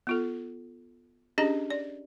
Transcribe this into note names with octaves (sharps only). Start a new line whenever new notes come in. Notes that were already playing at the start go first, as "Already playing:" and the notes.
B3 F4 A4
C#4 D4 G4 G#4 D#5 A#5
D5